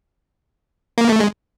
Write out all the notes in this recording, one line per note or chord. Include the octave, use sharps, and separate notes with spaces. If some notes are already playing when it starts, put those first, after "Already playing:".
A#3
A3
G#3